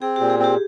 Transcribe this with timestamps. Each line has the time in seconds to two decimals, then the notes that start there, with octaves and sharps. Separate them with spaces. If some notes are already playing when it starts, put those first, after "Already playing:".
0.01 C4 G#4
0.16 G4
0.20 A#2
0.30 G#4
0.39 C4 G4